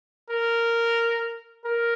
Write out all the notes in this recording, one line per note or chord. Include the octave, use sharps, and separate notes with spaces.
A#4
A#4